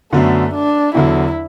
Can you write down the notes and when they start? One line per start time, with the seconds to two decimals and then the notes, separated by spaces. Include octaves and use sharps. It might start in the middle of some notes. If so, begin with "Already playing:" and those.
0.13 F#2 D3 A3 B3 D4 F#4
0.54 D4
0.95 E2 D3 F#3 E4